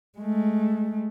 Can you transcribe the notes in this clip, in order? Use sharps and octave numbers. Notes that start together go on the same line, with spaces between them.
G#3 A3